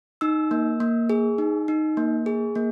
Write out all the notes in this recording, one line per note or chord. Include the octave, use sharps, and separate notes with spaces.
D#4 E6
A#3
A#3
G#4
D#4
D#4
A#3
G#4
A#3